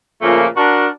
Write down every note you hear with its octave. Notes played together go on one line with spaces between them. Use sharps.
A#2 C#3 F3 A3 A#3
D4 F#4 A#4